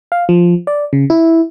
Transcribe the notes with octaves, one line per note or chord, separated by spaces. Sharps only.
F5
F3
D5
C#3
E4